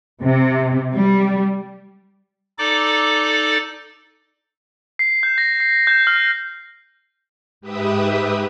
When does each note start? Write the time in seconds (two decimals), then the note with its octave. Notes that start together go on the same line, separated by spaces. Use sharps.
0.22 C3
0.94 G3
2.58 D#4 A4 D5 D6
4.99 C7
5.23 G6
5.38 A#6
5.60 C7
5.87 G6
6.07 F6
7.61 G#2 G4 B4 E5 D#6